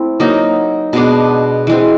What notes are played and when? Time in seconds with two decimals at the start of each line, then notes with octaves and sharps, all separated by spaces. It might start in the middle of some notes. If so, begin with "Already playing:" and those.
Already playing: A3 C4 E4
0.20 F#3 A#3 D#4
0.93 B2 G#3 B3 D4
1.67 E3 G#3 C4